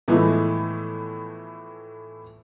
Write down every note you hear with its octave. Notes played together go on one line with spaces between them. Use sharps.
A2 E3 F3 G#3 A3 B3